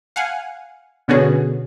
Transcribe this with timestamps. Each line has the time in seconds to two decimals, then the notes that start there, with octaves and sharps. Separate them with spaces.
0.16 F5 F#5 G#5
1.08 B2 D3 B3 C#4 F#4 G#4